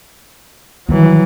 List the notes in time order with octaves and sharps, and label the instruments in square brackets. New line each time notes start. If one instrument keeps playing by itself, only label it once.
[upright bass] D#3 G3 [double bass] E3 F#3